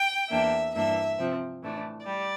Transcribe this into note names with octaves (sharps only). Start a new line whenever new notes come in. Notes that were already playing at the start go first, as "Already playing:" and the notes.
Already playing: G5
E2 E3 A#3 D4 E5
G2 E3 A#3 D4 E5
C3 F3 C4
A2 E3 A3 D4
G3 D5